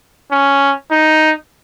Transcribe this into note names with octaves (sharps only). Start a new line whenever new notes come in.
C#4
D#4